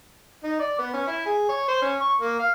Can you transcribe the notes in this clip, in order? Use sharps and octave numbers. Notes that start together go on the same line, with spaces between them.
D#4
D5
B3
C#4
E4
G#4
C#5
C5
C#4
C#6
A#3
F5